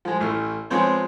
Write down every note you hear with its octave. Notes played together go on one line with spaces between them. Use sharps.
F3 G#3
A1 A3 F6
F3 G#3 B3 C4 C5 C#5